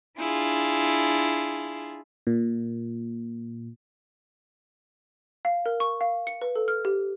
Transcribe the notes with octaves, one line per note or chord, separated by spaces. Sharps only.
D4 E4 F4 G#4
A#2
F5
A#4
C#6
F5
C#7
B4
A4
F6
G4